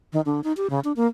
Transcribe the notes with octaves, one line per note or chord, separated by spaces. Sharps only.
D#3
D3
D#4
G4
C#3
D4
A#3